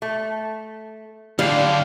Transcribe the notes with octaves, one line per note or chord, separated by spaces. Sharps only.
A3
D3 F#3 G3 D4 F5